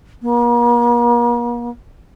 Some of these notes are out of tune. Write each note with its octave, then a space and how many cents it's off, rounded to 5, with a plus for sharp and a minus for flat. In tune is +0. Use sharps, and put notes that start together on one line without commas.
A#3 +40